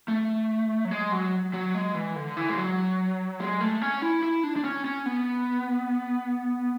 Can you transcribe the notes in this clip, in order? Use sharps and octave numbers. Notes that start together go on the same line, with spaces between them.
A3
F#3
G#3
F#3
F#3
G#3
E3
D3
E3
G#3
F#3
G#3
A3
C#4
E4
E4
D4
D4
C#4
C#4
B3